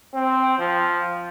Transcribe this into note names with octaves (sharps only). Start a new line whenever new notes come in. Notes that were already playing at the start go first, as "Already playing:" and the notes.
C4
F3